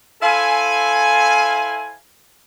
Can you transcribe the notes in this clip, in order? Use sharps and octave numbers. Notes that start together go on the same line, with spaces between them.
E4 A4 C5 F5 G#5